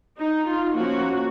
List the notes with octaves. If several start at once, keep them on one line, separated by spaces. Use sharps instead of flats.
D#4
F4
F3 A#3 C#4 F#4